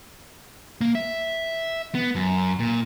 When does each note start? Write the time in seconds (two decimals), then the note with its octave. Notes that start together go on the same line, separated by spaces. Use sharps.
0.81 A#3
0.95 E5
1.95 B3
2.15 F#2
2.59 A#2